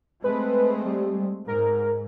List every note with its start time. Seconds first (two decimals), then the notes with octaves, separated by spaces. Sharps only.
0.24 G#3 A3 C4 B4
0.85 G3
1.48 G#2 A#4